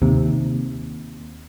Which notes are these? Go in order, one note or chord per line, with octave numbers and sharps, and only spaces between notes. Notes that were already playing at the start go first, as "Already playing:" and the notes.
D#2 C3